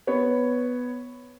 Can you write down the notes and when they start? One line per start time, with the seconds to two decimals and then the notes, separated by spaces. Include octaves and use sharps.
0.07 B3 C#5